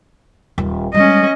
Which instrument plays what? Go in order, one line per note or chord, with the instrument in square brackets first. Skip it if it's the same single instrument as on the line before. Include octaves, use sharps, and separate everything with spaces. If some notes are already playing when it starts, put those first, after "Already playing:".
[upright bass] D#1
[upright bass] G3 G#3 [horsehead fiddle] C#4 D#5